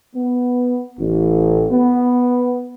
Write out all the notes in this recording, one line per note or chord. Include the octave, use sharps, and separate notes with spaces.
B3
A1
B3